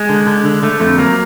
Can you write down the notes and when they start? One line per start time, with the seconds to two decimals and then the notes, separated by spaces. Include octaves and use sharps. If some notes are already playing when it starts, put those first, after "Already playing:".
Already playing: G#3
0.09 D3
0.27 D3
0.45 D3
0.63 D3 A3
0.80 F2 A3
0.98 F#3 A#3